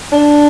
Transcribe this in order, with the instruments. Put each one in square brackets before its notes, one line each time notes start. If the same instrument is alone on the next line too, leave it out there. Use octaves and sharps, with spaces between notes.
[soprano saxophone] D4